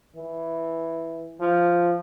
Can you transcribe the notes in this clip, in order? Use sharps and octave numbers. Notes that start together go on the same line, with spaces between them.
E3
F3